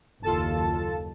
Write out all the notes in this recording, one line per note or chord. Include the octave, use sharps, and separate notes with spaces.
F#1 D#2 F4 A4 A5